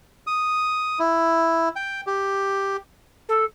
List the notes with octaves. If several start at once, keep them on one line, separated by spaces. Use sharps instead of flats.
D#6
E4
G5
G4
A4